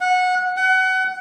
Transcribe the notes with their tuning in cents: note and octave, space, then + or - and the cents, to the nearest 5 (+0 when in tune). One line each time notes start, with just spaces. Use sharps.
F#5 -20
F#5 +25